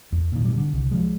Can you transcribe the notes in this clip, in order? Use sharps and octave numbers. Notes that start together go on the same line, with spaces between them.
E2
A#2 D#3
B2 G3
D3
C2
F3 G#3